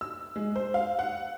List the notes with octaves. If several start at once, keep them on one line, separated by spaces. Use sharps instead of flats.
E6
G#3
C5
F5
F#5